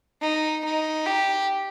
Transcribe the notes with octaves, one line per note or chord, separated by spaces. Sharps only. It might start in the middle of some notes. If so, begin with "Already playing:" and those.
D#4
D#4
G4